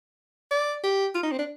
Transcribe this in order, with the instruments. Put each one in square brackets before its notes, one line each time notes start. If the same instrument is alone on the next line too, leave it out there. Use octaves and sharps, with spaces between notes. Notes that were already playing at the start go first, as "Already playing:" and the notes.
[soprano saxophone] D5
G4
F4
D#4
C4
D4